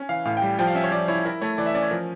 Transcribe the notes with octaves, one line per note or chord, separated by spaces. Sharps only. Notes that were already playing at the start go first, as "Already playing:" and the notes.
Already playing: C#4
E3 F5
A2 F5
G5
G3
F3 G5
F5
C#4 E5
C#5
F3 D5
E4 C#5
E4 A#4
A3 C#5
E3 D5
E5
C#4 D5
C#5
F3 A#4